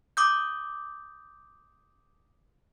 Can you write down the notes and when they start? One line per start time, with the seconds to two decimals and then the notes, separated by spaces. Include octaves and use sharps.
0.17 D6 D#6 G6